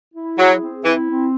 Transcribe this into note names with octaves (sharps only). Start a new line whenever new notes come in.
E4
F#3 G#4
C4
E3 E4
C4